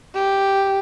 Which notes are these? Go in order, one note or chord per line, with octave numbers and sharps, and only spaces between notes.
G4